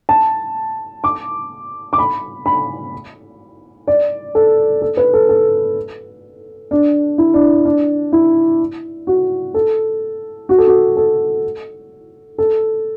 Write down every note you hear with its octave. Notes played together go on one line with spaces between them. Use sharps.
A5
D6
D6
B5
B5
D5
A4
A4
B4
A4
A4
D4
E4
D4
D4
E4
F#4
A4
F#4
A4
F#4
A4
A4